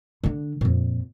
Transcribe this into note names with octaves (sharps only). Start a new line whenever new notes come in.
D3 D4
F2 A#2